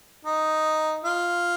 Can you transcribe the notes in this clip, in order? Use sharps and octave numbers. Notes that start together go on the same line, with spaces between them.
D#4
F4